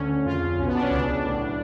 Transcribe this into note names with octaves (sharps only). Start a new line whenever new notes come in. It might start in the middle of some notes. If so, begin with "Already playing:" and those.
Already playing: D2 D3 C#4
F2 C#3 F4
B1 B2 C#4
B3
D4
C#4
C#2 C#3 D4
B1 A2